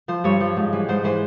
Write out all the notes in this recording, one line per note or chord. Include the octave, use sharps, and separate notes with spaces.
F3 C5
G2 C#5
F3
G#2
E3
G#2 C5
E3 C5